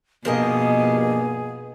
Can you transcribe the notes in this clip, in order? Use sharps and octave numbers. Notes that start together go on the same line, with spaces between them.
G2 B2 F3 A#3 G#4 A#4 D#5